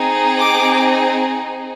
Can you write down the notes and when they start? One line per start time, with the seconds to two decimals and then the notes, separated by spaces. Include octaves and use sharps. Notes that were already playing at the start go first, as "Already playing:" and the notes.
Already playing: C4 D#4 G#4
0.38 D6